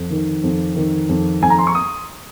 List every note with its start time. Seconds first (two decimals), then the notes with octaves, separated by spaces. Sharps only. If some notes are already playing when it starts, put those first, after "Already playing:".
Already playing: F2
0.10 D#3
0.44 F2
0.76 D#3
1.09 F2
1.42 F2 G#5
1.50 A#5
1.58 C6
1.67 C#6
1.75 D#6